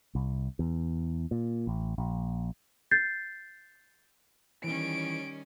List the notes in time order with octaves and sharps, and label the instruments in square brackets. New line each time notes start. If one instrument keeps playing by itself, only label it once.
[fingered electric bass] C2
E2
A#2
A1
A#1
[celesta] G6 A6 C7
[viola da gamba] D#3 G3 C#4 [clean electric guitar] E3 [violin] D7